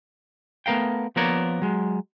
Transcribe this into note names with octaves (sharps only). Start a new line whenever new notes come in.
A3 B3 A#4 F5 G5
F3 A#3 B3 A#4 C#5 D5
F#3 G#3